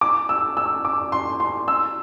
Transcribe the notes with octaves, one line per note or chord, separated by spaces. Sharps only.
D6
E6
E6
D6
C6
C6
E6